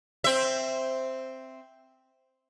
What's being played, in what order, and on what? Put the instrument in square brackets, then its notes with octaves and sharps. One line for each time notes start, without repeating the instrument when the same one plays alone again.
[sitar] C4 E5